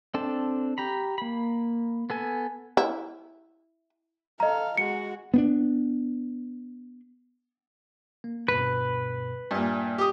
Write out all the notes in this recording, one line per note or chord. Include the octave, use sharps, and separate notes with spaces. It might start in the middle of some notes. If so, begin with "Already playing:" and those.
C4 D4 A4 A5
G4 A#5 B5
A#3 B5
B3 A4 G#5
E4
A4 D#5 F5 A#5
G#3 F#4 C#7
B3 C4 D4
A#3
D2 G2 B2 B4
G2 A#2 E5 G#5
G4 D#6